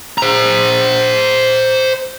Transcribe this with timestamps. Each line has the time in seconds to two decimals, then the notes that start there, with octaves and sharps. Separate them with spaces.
0.18 C5 A#5